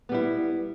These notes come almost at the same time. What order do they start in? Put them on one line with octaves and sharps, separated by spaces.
B3 G3 E4